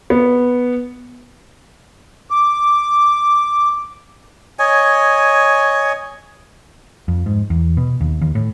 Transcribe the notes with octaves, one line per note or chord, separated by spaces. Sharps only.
B3
D6
C#5 D#5 G#5
F2
G#2
E2
B2
D#2
D#2
A2